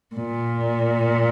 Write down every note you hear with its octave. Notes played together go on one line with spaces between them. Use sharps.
A#2